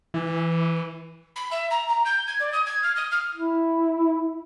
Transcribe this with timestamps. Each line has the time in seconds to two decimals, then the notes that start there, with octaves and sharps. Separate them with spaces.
0.14 E3
1.36 B5
1.51 E5
1.71 A#5
1.89 A#5
2.05 G6
2.27 G#6
2.40 D5
2.53 D#6
2.66 G#6
2.83 F6
2.96 D#6
3.11 F6
3.34 E4